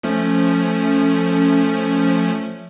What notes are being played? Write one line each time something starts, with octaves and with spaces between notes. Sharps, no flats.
F3 A3 C#4